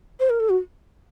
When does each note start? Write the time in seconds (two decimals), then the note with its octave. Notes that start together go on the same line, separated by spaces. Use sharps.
0.20 C5
0.30 A#4
0.40 A4
0.49 F#4